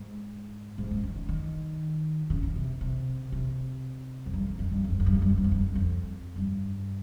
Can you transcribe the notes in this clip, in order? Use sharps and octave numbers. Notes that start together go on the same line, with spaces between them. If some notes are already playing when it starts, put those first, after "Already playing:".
Already playing: G#2
G#2
C#3
D#3
C#3
D#3
C#3
D#3
C3
C3
C3
F2
G2
F2
F2
G2
F2
G2
F2
G2
F2
G2
F2
G2
F2
G2
F2
G2
F2
G2